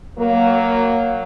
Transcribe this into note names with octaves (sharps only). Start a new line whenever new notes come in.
F#3 A#3